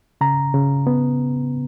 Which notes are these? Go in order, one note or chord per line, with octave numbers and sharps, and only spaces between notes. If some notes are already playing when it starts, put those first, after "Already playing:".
C#3 A#5
C#3
B3